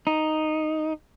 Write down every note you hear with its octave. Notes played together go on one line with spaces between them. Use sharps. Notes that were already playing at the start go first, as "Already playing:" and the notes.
D#4